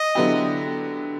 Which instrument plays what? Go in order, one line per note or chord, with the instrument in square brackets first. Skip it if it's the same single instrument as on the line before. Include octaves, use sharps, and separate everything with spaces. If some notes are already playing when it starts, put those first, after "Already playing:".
Already playing: [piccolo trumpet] D#5
[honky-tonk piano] D3 F#3 B3 E4 G4